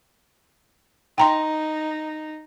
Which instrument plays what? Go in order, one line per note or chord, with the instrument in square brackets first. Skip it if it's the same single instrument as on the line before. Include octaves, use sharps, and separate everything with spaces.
[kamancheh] D#4 [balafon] G5 A#5 C6